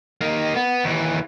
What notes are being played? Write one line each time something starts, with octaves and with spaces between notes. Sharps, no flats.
A#3 D#4
B3
D#2 E3